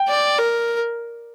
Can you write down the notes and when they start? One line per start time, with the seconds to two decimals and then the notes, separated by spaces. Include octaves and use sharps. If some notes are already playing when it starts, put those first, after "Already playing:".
Already playing: G5
0.09 D5
0.38 A#4